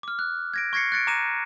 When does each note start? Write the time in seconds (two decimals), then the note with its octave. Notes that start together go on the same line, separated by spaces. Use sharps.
0.03 D6 F6
0.19 F#6
0.54 G#6 A#6 D7
0.73 C#6 G#6 A#6 C7 C#7
0.92 F#6 A6 C#7 D7
1.07 A#5 D6 A#6 D#7 E7